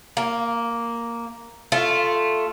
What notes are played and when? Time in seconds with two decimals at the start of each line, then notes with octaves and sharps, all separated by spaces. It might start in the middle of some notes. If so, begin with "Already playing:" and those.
0.17 A#3
1.72 A3 F4